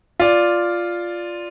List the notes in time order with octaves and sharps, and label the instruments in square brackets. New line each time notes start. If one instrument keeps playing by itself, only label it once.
[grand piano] F4 D5